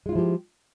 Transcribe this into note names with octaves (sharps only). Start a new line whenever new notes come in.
F3 G#3 E4 F4 G4